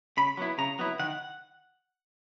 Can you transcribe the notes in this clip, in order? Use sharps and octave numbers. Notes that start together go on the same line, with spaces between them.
C#3 B5
F#3 B3 E4
C#3 A#5
F#3 B3 E4
D#3 F#5